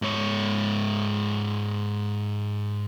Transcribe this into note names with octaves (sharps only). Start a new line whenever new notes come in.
G#2 C#5